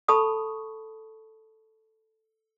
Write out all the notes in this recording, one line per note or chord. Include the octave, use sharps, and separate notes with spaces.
A4 A5 B5 C#6 D#6